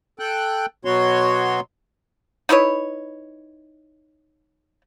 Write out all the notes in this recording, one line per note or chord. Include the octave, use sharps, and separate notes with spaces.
A4 G5 F#6
B2 F#3 B3 F#4 C#5 C6
D#4 E4 B4 C#5